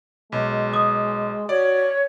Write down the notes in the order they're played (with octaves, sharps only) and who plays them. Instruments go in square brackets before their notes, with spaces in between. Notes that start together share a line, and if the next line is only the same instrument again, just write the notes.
[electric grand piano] B1 [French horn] G#3
[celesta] D#6
[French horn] F#4 [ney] C#5 [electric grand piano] D5